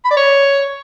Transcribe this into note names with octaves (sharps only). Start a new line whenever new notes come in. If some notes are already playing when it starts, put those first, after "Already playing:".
B5
D5
C#5